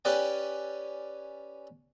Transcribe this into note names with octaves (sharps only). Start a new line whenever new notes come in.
C#4 G4 B4 D5 G#5